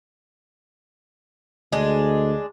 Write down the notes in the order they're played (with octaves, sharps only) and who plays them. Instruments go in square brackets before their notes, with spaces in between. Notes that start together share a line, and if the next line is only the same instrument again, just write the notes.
[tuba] D2 [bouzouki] G#3 D4